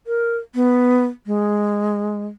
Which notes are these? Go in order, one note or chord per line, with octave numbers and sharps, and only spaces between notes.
A#4
B3
G#3